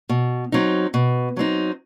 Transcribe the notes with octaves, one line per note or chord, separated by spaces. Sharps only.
B2
F#3 C4 D#4
B2
F#3 C4 D#4